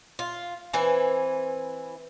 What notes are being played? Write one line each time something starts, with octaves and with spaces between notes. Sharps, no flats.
F4
E3 C4 B4 G#5